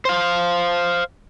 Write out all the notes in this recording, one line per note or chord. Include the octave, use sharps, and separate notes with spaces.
C5 F5